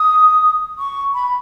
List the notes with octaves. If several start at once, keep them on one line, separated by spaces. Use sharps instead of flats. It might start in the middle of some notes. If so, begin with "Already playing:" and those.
Already playing: D#6
C#6
B5